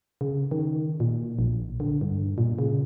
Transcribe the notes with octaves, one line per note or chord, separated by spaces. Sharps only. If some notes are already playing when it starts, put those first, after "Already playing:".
C#3
D#3
A#2
A#1
D3
G2
A#2
C#3